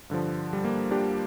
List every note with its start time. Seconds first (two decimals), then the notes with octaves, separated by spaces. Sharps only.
0.10 G2 D3 F3
0.53 G3
0.64 A#3
0.91 D4 G4